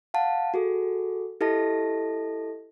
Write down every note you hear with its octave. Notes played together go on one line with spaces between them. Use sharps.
F5 F#5 A5
F#4 G#4 A4
E4 G4 A4 D#5 A5 A#6